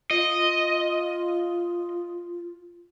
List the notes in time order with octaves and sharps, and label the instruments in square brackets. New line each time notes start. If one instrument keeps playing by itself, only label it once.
[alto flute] F4 [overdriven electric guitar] D#5